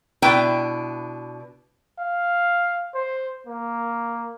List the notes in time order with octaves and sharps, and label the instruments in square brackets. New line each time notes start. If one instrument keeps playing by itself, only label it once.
[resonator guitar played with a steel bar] B2 D4 E4 B4 G5
[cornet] F5
C5
A#3